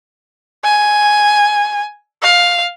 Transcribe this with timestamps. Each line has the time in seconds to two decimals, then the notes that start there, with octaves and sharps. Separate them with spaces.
0.64 G#5
2.22 F5